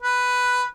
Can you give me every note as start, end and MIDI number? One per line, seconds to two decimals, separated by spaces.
0.02 0.68 71